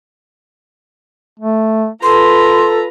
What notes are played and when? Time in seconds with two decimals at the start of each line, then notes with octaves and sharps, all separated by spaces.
1.40 A3
2.03 F4 A4 B4 A#5 C6